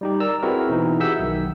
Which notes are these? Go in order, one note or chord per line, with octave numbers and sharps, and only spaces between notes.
G3 D#4 G4
A#4 D5 A#5 E6
C4 E4 F#4 G#4 A#4 B4
B2 E3 D#4 E4
G4 G#4 E5 F#5 E6 G6
B1 D#3